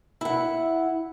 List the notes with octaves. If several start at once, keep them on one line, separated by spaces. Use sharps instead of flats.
E4 F#5